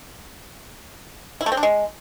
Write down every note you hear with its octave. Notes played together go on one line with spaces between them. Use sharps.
E4
A3
C4
D4
G#3